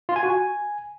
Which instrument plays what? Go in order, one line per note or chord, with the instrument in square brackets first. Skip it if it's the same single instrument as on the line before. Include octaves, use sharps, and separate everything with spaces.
[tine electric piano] F4
G#5
F#4
G#5